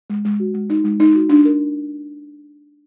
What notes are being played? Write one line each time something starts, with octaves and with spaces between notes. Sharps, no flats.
G#3
G#3
F#4
G#3
D#4
G#3
D#4
F#4
D4
A#4